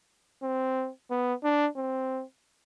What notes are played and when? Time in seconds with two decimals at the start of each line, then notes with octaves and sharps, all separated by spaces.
0.43 C4
1.10 B3
1.44 D4
1.76 C4